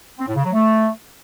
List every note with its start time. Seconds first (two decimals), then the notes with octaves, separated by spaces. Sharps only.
0.19 C4
0.27 A2
0.36 C#3
0.44 F#3
0.53 A3